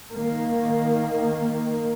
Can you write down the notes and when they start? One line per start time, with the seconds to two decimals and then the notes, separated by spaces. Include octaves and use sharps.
0.14 D#3 A#3